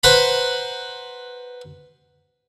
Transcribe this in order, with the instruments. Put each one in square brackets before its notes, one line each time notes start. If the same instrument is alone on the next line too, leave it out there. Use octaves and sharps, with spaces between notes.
[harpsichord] B4 C5 F#5 A#5 B5